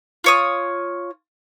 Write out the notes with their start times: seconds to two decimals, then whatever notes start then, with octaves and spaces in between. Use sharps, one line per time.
0.24 F4 C#5 D#6